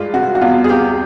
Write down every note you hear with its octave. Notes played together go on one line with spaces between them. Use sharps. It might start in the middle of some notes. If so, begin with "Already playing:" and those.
Already playing: G2 G#3 F4
C3 F#4
F#4
E2 F4
G#4
C2 G4